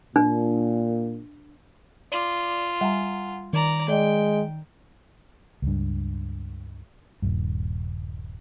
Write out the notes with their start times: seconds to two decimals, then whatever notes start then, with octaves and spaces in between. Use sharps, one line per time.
0.16 A#2 D4
2.12 F4 D5 D6
2.81 G3 F#5 G#5 A#5
3.53 D#3 D5 A#5
3.88 G#3 D5 D#5 G5
5.62 C#2 G2
7.22 D#1 G2